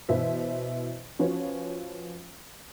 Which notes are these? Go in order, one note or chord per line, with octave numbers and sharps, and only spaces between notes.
B2 E3 E4 C5 E5
F3 C#4 F#4 B4 C#5